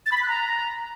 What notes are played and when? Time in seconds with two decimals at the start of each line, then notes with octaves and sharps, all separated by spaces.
0.06 A6
0.12 B5
0.17 B6
0.23 F#6
0.29 A#5